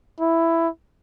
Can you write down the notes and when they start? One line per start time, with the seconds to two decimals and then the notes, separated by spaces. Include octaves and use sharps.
0.20 E4